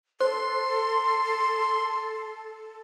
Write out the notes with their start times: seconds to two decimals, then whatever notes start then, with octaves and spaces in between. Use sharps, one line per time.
0.21 A4 C5 C6